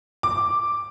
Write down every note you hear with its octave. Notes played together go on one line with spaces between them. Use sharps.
D6